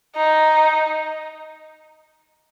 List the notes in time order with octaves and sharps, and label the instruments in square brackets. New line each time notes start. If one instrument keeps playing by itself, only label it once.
[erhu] D#4